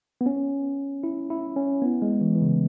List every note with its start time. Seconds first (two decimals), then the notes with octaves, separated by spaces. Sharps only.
0.21 B3
0.26 C#4
1.03 E4
1.30 E4
1.56 C#4
1.82 B3
2.02 G#3
2.21 E3
2.35 E3
2.42 C#3